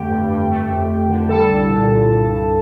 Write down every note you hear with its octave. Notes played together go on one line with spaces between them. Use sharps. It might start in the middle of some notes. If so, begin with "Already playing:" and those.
Already playing: F2 D3 A3 G4 G5
G2
G2
A3
F2
F2
D3
G3 A4 A5
C2
A#2
C2
G2
G2